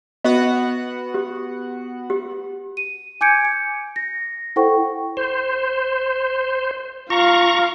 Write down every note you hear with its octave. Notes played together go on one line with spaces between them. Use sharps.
B3 F#4 D#5 F#5
G4
G4
D#7
G#5 D6 G6 G#6 C#7 D7
C#7
A#6
E4 A4 C5 F#5 G5 C#6
C5
F4 F5 A#5 C#6